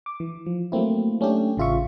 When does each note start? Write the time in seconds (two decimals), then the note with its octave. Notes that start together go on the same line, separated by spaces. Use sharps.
0.06 D6
0.20 E3
0.46 F3
0.72 F#3 A3 A#3 C4 E4
1.21 A3 C#4 D4 G4
1.57 A1 C#3 F4 E5 C#6